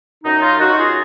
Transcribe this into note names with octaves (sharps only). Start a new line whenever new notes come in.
F#2 D#4
F4
F#2 D#4 F#4
F4 G#4